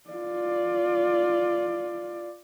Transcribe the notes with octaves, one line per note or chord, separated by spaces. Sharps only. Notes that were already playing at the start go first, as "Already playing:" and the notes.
F4 D5